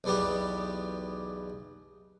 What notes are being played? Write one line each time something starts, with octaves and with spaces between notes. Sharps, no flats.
B1 E2 G3 B3 G4